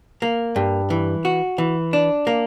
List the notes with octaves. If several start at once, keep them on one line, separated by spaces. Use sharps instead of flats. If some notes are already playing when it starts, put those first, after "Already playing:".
A#3
G2
E3
F#4
E3
D4
A#3